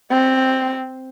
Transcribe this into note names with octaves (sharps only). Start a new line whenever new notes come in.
C4